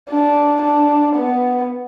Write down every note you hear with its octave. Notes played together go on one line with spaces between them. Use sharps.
D4
D4
B3